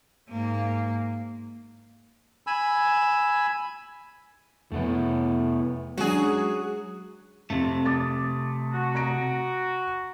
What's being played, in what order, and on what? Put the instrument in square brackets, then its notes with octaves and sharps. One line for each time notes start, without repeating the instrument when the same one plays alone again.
[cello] G#2 A#3
[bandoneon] G#5 B5 E6
[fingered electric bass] F2 C3 [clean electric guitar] A3 B3 E4
[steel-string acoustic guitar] F#3 [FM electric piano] G#3 C#4 D4 [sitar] F#4 G#4
[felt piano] F2 [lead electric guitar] C3 A3
[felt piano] D6 D#6 A6
[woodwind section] F#4
[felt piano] A#5 A#6 D7